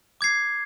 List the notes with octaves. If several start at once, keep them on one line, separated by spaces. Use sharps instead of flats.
D6 G#6 C7